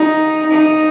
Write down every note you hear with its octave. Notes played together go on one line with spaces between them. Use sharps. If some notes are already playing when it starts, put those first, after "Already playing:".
Already playing: D#4
D#4